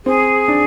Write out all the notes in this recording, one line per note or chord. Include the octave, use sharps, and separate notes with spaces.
C4 G#4
D4